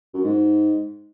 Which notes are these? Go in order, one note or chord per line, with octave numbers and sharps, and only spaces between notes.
F#2
G#2